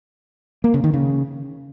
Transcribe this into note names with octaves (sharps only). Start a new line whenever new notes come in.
A#3
C#3
D#3
C#3